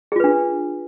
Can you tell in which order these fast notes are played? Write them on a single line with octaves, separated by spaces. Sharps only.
G#4 F4 B4 D4